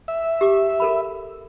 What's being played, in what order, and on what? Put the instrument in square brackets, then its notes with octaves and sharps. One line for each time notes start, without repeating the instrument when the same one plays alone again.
[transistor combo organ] E5
[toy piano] G4 D6
A4 A#4 B5